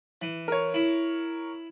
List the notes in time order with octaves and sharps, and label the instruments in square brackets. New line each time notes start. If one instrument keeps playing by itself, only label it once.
[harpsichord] E3
[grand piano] A#4 C#5
[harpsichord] E4